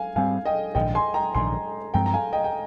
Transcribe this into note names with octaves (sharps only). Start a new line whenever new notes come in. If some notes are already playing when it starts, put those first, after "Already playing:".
Already playing: F5 G#5
G#2 G3 C4 F5 G#5
D#5 G5
A#1 G#2 D#3 D#5 G5
G#5 C6
G5 A#5
A#1 G#2 D#3 G#5 C6
G2 F3 G#3 C4 G5 A#5
A#5
F5 G#5
D#5 G5
G5